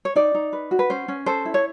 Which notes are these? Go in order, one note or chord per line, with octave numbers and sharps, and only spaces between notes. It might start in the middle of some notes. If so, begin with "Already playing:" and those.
C#5
D#4 D5
D#4
B4
F#4
B4
C#4 C5
C#4
A4 C5
E4
C#5